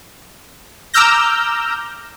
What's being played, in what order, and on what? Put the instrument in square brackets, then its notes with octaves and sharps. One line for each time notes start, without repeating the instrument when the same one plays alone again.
[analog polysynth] A#5 D6 E6 F6 G6 A#6